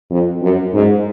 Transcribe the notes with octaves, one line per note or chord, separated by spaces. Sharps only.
F2
F#2
G#2